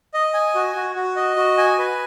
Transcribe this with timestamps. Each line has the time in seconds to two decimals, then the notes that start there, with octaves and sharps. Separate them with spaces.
0.14 D#5
0.34 G#5
0.55 F#4
0.75 F#4
0.96 F#4
1.16 D#5
1.36 F#4
1.58 G#5
1.79 B4